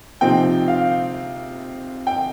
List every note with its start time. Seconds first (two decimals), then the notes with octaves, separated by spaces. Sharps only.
0.21 C3 F3 C4 D#4 G5
0.68 F5
2.07 G5